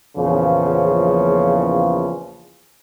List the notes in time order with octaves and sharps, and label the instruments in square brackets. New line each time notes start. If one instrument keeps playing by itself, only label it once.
[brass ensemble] A#1 E2 C#3 F3